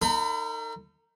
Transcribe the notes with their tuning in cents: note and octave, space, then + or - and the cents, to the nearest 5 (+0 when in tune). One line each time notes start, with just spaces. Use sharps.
D#4 +0 A#4 -45 B5 +35